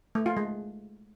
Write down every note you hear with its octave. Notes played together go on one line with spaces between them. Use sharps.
A3
F4
G#3